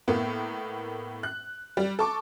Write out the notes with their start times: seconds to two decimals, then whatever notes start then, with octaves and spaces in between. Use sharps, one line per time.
0.08 A2 A#3 B3
1.23 F#6
1.77 G3
1.99 A4 A5 C#6 D6